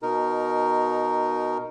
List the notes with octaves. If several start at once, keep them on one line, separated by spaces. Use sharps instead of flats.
B2 D#4 A#4